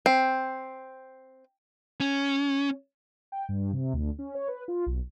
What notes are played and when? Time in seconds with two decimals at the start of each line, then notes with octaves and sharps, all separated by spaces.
0.06 C4
2.00 C#4
3.32 G5
3.49 G2
3.73 C3
3.93 D2
4.19 C#4
4.35 C#5
4.48 B4
4.68 F4
4.86 B1